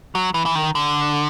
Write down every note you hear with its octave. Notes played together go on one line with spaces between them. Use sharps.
F#3
E3
E3
D#3
D3